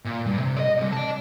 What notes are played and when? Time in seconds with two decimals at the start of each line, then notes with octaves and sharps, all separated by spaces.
0.05 A#2
0.26 G2
0.39 C3
0.56 D5 D#5
0.77 C3 G3
0.92 D5 A5